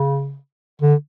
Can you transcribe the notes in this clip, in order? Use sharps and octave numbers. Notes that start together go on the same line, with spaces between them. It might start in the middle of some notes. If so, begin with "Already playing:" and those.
Already playing: C#3
D3